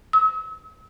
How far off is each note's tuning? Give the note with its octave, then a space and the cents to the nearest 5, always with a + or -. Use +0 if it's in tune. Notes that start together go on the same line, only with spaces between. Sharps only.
E6 -40